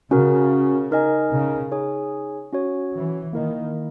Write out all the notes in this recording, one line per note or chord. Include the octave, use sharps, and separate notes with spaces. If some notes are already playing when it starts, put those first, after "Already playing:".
C#3 C#4 F#4 A#4
D#4 A#4 D#5 G#5
C#3
D#4 G#4 C#5 G#5
C#4 F#4 C#5
E3
D#3 A#3 E4 A#4 D#5